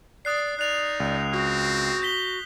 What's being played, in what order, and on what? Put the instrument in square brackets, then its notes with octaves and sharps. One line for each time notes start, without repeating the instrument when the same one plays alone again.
[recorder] D5 [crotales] D#6 F#6 C7
[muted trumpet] D#4 [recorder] D5 [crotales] F#6 F7
[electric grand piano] C#2
[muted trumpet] C4 [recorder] F#4
[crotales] G6 B6 G7